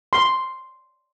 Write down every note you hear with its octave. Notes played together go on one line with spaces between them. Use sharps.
C6